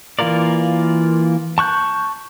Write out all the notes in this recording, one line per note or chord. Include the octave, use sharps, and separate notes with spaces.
E3 A#3 F4 A#4 D5
A5 C#6 F#6 G6